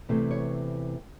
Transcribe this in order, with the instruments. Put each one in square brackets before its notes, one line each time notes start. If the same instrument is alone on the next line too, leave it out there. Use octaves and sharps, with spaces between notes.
[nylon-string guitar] E2 C3 E3 A3 C4
C#5